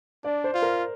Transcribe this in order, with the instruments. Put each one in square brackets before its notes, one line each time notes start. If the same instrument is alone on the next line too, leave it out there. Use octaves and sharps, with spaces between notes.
[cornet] D4 [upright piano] D5
[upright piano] C5
[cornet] F4
[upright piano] A#4